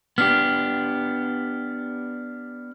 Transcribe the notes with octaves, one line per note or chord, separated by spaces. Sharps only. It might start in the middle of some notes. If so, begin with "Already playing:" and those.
B3 D4 G4 F6